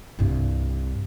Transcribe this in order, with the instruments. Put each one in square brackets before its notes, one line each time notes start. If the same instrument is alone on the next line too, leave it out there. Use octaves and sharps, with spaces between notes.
[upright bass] C2 G2